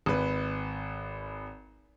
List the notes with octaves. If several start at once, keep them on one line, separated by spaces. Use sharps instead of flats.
G#1 B4